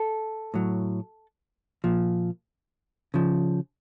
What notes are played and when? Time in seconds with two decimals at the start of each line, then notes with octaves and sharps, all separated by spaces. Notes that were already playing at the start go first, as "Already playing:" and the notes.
Already playing: A4
0.54 A2 F#3
1.84 A#2 F3
3.14 C#3 F3